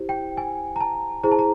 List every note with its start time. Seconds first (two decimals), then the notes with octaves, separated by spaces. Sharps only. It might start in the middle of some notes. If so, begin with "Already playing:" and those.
Already playing: E4 G4 C5
0.09 G5
0.37 G#5
0.76 A#5
0.80 A5
1.23 E4 G#4 C5 A#5
1.31 A5
1.39 A#5